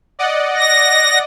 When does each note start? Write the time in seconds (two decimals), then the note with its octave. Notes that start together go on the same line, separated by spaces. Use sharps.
0.19 D5 D#5 F#5
0.56 A#6